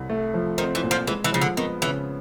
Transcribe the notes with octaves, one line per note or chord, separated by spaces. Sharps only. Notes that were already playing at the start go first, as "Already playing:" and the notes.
Already playing: C2
A3
F3
D#3 C4
E3
A#2
F3
E3 G#3
E3
C#3 F3
D3
D#3 B3
C#3 E3